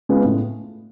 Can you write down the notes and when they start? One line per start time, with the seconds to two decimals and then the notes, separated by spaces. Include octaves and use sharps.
0.09 G#3 B3 F4
0.25 A2